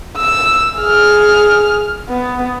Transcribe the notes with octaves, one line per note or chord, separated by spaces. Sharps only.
E6
G#4 F6
B3